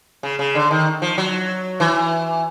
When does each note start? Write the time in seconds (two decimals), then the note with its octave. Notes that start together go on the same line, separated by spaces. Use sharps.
0.23 C#3
0.39 C#3
0.55 D3
0.71 D#3
1.02 F3
1.18 F#3
1.80 E3